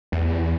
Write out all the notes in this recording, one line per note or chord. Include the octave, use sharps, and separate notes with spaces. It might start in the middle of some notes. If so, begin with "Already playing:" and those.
E2